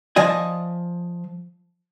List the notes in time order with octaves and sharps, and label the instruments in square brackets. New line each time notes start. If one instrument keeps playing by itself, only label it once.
[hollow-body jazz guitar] F3 D5 D#5 G#5